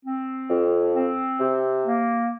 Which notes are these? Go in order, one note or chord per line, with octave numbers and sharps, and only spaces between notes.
C4
F2
C4
C3
A#3